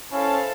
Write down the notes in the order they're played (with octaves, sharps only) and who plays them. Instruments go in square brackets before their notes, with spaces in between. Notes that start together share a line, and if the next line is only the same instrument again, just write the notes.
[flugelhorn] C#4 [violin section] E4 A4 C5 F5 A5